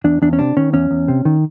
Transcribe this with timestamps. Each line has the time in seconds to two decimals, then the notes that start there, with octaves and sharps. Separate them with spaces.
0.04 E2 D4
0.22 E2 D4
0.33 C#4
0.39 C3 D4
0.57 D#3 C#4
0.73 E2 C#4
0.91 E2
1.08 C3
1.25 D#3